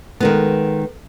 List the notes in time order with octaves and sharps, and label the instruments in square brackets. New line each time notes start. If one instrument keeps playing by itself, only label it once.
[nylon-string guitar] D#3 G#3 B3 [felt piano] A4 A#4